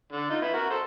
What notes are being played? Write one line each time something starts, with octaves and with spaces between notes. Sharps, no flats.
D3
D#4 F4
B3 E4
F#4 A#4
A4 C5